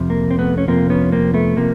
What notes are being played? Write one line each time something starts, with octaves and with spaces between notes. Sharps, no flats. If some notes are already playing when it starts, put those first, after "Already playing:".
Already playing: F2 C3 F3
A#3
C4
A3 B3
C#4
F2 C3 F3 A#3 C4
B3 C#4
A#3 C4
A3 B3
C3 F3 A#3